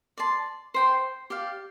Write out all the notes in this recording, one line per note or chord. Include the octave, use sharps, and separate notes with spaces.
D5 A5 C6
C5 G5 C6
G4 D5 F5